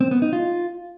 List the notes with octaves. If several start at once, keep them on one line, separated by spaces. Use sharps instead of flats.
C4
B3
D#4
F4